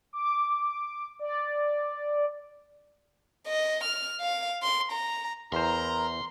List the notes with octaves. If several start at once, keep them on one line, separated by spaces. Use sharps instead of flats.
D6
D5
D#5
F6
F5
C6
A#5
E2 E4 A#4 C5 A#5 C6